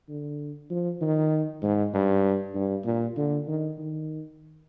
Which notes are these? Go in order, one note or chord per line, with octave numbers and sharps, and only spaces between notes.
D3
F3
D#3
G#2
G2
G2
A#2
D3
D#3
D#3